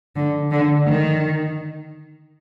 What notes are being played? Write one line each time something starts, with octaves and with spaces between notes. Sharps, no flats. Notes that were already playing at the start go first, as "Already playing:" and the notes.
D3
D3
D#3